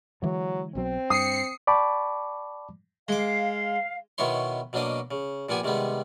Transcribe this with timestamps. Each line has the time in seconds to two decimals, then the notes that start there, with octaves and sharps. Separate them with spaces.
0.22 D3 E3 F#3 G#3
0.75 B1 B2 F#3 C4
1.10 G2 D#6 C7 C#7
1.67 D5 G5 A5 B5 C#6 D6
3.09 G#3 F5 D6
4.18 B2 D#3 B3 E4 C#5 C6
4.73 B2 F#3 A#3 D4 D#5 F5
5.11 C#3
5.49 A#2 F3 B3 G4 G#5
5.64 C3 D#3 G3 G#3 B3